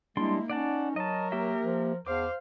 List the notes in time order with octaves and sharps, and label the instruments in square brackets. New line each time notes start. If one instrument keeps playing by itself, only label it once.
[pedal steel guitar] G3 D4 C6 [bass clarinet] G#3 [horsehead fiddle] A#3 E4
[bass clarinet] C#4 [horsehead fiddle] D#4 [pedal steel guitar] D5 F#5 A5
[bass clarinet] F#3 [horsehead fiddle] A#4 [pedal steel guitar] D#5 A5
[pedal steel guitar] A#3 G4 E5
[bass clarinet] F3
[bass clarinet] E2 [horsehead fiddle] C5 F5 [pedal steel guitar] D6